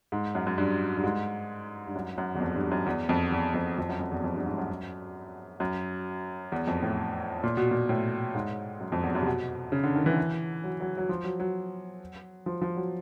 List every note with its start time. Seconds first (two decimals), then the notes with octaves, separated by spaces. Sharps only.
0.12 G#2
0.35 F#2
0.47 F#2
0.58 G2
0.97 G2
1.04 G#2
1.87 G2
1.95 F#2
2.18 F#2
2.35 E2
2.40 F2
2.56 G2
2.72 F#2
2.86 E2
3.09 F2
3.32 E2
3.54 F2
3.78 F2
3.89 F#2
4.00 F2
4.11 E2
4.24 F2
4.35 G2
4.46 G#2
4.58 F#2
5.60 F#2
6.52 E2
6.67 F2
6.83 A2
7.43 A#2
7.57 B2
7.71 A#2
7.89 A2
8.35 G#2
8.80 F#2
8.92 F2
9.03 E2
9.15 F#2
9.22 C3
9.27 B2
9.72 C#3
9.83 D3
9.95 D#3
10.06 E3
10.64 F#3
10.81 F#3
10.98 F#3
11.09 F3
11.24 F#3
11.40 F#3
12.46 F3
12.62 F3
12.77 F#3